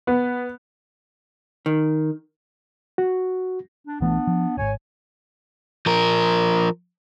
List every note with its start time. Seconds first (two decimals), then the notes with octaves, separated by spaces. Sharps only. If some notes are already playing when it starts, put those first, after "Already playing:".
0.07 B3
1.66 D#3
2.98 F#4
3.86 D4
4.00 B1 E3 A3 B3 D4
4.27 F3
4.57 D1 G#1 C#5 G#5
5.86 F3 A#4